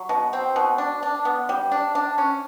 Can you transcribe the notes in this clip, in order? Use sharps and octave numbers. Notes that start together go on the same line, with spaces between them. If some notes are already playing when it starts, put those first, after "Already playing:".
Already playing: F#3
B2
C4
B2
D4
D4
B3
G3
D4
D4
C#4